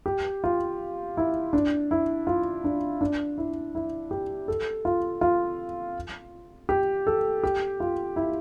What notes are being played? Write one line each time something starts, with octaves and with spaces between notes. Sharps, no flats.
G4
F4
E4
D4
E4
F4
D4
D4
E4
E4
G4
A4
F4
F4
G4
A4
G4
F4
E4